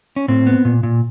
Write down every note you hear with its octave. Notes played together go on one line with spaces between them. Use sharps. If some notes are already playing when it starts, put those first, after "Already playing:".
C#4
A2 C4
B3
A#2
A#2